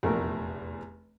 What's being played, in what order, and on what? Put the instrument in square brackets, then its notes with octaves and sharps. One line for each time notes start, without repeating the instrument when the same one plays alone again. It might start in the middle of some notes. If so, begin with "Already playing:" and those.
[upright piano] F1 E2 [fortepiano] A#1 A3 A#4